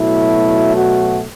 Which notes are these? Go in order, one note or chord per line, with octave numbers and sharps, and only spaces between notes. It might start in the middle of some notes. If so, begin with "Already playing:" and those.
Already playing: B2 F#3 A3 E4
F#4